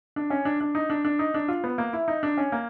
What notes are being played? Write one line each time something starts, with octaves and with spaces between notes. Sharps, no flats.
D4
C#4
D4
D4
D#4
D4
D4
D#4
D4
F4
B3
A#3
E4
D#4
D4
C#4
A#3